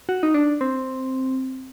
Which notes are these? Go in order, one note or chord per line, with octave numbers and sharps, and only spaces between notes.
F#4
D#4
D4
C4